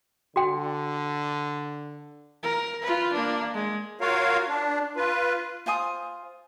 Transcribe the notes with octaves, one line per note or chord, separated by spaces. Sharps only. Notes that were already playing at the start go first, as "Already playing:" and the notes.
D3 F#4 G5
A#4
F4 B4
A#3 D4
G#3
F4 F#4 A#4 C#5 F5
D4
F4 B4
F4 C5 G#5 D#6